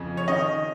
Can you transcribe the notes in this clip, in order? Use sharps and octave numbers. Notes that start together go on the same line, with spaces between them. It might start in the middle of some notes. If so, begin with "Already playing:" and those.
Already playing: F2 C#3
C#5
D#3 D#5